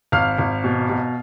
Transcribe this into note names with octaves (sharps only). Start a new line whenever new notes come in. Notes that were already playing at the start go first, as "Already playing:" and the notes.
G#1 F5 F6
G#1
B2
B2